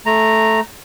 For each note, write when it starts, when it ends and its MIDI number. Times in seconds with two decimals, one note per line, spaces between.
0.06 0.60 57
0.06 0.60 82